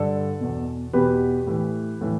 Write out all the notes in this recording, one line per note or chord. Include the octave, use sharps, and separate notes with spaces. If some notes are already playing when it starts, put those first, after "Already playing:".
Already playing: G2 D3 A4 D5
E2 B2
E2 B2 G4 B4
A2 E3
A2 E3